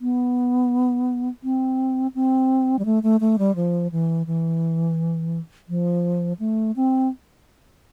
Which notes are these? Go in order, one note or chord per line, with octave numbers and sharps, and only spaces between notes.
B3
C4
C4
G3
A3
A3
A3
G3
F3
E3
E3
F3
A3
C4